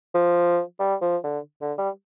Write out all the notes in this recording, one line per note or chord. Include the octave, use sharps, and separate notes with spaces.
F3
G3
F3
D3
D3
G3